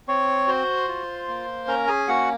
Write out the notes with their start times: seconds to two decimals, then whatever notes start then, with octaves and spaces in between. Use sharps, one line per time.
0.08 C4 C#5 C#6
0.47 F#4 C5 C6
0.88 F4
1.28 A#3
1.67 C#4 A#4 A#5
1.88 G#4 G#5
2.08 A#3 F#4 F#5